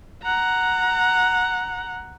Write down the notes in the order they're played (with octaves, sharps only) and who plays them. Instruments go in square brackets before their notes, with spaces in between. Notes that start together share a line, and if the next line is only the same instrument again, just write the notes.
[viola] F#5 A#5